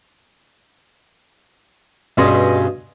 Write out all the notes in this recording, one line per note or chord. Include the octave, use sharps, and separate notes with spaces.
G2 B2 C#4 G#4 D#5 C6